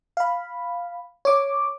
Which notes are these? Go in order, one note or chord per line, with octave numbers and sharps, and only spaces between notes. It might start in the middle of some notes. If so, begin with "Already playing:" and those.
F5 B5
C#5 D6